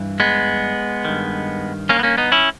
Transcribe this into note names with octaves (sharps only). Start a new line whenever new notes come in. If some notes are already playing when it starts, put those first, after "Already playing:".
Already playing: G2 E3
G#3 B3
G2 D#3
A#3 C#4
B3
A#3 C#4
B3 D#4
C#4 E4